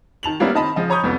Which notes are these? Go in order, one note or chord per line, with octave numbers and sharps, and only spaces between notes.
D#3 A5 F7 F#7
G3 A#3 B3 C#4 D#4 E4
D#3 C4 D#5 A5 B5
C#3 F3 D#5
C#5 A#5 B5 C#6 D#6 G6
C2 F2 B3